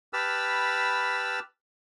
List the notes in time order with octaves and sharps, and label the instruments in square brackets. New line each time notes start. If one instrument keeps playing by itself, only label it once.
[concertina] G4 B4 A5 B5 E6 F6